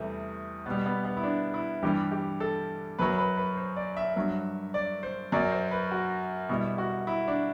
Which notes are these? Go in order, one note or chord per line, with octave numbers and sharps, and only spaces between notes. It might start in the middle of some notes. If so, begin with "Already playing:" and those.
Already playing: E2 C3 E3 G3 A3
B2 G3 B3
B3
B3
E4
D4
E4
G2 E3 G3 G4
G4
A4
F#2 F#3 B4
B4
B4
C5
D5
E5
G2 F#3
D5
C5
F#2 F#3 D5
C5
B4
F#4
B2 G3 E4
F#4
E4
D4